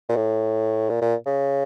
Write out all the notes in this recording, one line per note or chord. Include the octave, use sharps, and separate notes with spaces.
A#2
A2
A#2
A#2
C#3